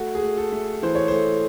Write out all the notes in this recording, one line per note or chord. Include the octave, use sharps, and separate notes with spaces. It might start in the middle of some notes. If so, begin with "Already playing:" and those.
Already playing: A3 F#4
G#4
A3
A4
A3
E3 C5
C#5
A3 C5